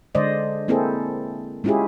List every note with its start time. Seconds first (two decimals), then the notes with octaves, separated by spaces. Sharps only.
0.15 D3 G#3 C5 D5 D#5
0.68 A#3 C4 E4 G#4 A4
1.64 G#3 C#4 E4 F4 G4 G#4